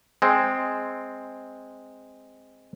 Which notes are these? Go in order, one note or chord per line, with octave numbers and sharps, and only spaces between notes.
G#3 C4